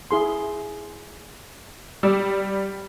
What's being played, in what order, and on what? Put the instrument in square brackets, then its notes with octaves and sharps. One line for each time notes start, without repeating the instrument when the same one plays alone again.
[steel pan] E4 G#4 C6
[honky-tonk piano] G3 [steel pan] D6 E6